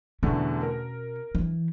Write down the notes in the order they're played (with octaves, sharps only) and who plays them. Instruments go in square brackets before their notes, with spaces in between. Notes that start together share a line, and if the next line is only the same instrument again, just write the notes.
[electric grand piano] E2 D3 A3 [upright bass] B2 C#4
[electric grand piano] A#4
[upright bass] E3